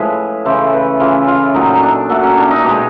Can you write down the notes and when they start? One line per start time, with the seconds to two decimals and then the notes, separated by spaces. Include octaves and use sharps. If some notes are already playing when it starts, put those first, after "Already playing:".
Already playing: A2 F3 G#3 B4
0.45 C#3 E3 A3 C5
0.73 B4
1.00 C#3 E3 A3 F4
1.27 F4
1.54 A#2 F#3 A3 D#4
1.83 D4
2.09 A#2 F#3 A3
2.23 C#4
2.37 D4
2.50 D#4
2.64 B2 G#3 G4